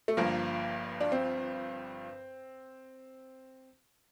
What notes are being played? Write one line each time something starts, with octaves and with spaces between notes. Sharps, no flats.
A3
G1 G2 F3 A#3
D4
C4